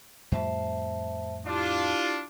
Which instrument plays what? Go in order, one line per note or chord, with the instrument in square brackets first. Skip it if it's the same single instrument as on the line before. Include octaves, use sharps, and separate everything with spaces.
[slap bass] F2 A2 G3 [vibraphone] C5 E5 A5
[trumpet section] D4 F4 [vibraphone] E4 G4 A5